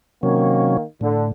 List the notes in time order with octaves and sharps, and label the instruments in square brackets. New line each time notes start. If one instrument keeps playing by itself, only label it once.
[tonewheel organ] C3 F#3 C#4 [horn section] D#3 A#3
[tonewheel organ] A2 [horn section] D3